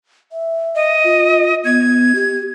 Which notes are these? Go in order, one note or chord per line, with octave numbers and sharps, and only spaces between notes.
E5
D#5
F4
B3 G#6
G4